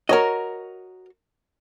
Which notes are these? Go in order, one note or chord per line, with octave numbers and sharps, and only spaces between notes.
F#4 A#4 C#5 D#5 A#5